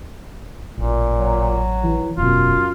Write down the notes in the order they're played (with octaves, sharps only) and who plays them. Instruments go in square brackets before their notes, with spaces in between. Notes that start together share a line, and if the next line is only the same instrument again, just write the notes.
[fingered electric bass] A1 [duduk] A#2
[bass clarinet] F#3
[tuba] E3
[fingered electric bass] E1 B2 [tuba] F#2 [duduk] F4